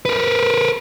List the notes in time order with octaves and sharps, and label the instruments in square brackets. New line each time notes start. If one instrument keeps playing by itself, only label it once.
[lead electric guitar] A#4 B4